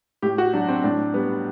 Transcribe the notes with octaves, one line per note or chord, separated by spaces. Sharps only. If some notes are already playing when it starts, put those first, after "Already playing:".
A2 G4
F#4
F#3 D4
C4
A2 D4
G3 B3